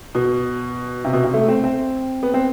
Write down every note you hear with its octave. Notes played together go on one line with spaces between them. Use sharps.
B2
C3
B2
C3
A3
C4
C4
B3
C4